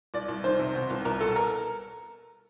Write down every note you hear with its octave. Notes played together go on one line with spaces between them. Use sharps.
C2 D5
C2
D#3 C5
C3
B2
C2
C2 A#4
B2 A4
A#4